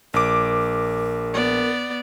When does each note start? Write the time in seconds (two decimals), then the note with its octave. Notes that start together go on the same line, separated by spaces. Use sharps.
0.14 A#1 A#4 D6
1.34 B3 D5